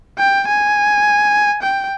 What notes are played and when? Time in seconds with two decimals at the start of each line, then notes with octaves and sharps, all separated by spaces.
0.18 G5
0.48 G#5
1.63 G5